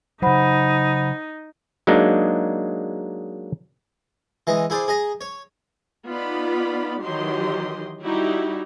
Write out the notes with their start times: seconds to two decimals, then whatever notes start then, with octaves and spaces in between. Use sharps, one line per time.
0.22 C#3 F#3 D#4 C5 F#5 B5
1.87 F#3 G#3 A#3 D4 D#4
4.47 E3 G#3 D#5
4.70 E4 G#4 C5 D5
4.88 G#4 D#5 A#5
5.21 C#5
6.07 B3 D#4 F4 D5 B5
7.02 D#3 E3 F#3 G4 D#5 C6
8.01 G3 D#4 E4 F#4 G4